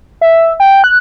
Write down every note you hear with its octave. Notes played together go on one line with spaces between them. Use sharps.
E5
G5
F#6